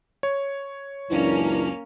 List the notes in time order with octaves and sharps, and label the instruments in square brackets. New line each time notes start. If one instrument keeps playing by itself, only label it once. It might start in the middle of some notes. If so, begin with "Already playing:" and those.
[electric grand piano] C#5
[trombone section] C#2 F#2 D4 [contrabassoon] E3 [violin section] A#3 C#4 F6